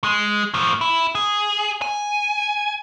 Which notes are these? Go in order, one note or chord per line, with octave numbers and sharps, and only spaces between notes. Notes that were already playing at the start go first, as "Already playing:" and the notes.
G#3
A2 F3
E4
G#4
G#5